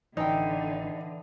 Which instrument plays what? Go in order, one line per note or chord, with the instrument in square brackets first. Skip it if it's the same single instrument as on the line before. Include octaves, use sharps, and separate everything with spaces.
[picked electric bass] A1 [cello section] D3 [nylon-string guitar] E3 G5 [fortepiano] D#4